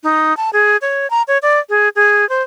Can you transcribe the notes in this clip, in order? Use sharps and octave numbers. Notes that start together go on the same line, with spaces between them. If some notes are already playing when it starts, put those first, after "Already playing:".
D#4
A5
G#4
C#5
A#5
C#5
D5
G#4
G#4
C5